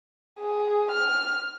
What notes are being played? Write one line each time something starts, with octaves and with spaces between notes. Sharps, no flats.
G#4
F6